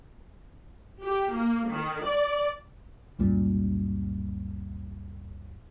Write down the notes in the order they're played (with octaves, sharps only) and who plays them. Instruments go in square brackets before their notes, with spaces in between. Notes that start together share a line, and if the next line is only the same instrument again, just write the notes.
[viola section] G4
A#3
D#3
D5
[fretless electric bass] C#2 F#2 A#2 G3